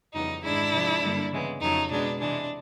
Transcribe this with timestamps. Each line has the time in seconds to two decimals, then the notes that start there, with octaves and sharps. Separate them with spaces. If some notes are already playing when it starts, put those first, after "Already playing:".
0.14 F2 C#3 E3 G3 B3 D#4
0.44 G#2 D#3 G#3 D4 E4
0.73 C3 F3 G#3
1.03 G2 D3 G3 A#3
1.32 C#3 E3 G#3 B3
1.61 F2 C#3 F#3 A3 D#4
1.91 B2 G#3 B3 D4
2.20 C3 E3 G#3 D4